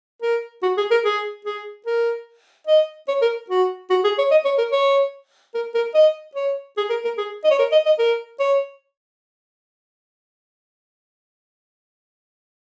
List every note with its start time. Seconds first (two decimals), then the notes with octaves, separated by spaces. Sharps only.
0.23 A#4
0.63 F#4
0.78 G#4
0.91 A#4
1.04 G#4
1.45 G#4
1.86 A#4
2.67 D#5
3.08 C#5
3.22 A#4
3.50 F#4
3.90 F#4
4.04 G#4
4.18 C#5
4.31 D#5
4.45 C#5
4.58 A#4
4.72 C#5
5.54 A#4
5.75 A#4
5.95 D#5
6.35 C#5
6.77 G#4
6.90 A#4
7.05 A#4
7.18 G#4
7.44 D#5
7.51 C#5
7.59 A#4
7.72 D#5
7.86 D#5
7.99 A#4
8.40 C#5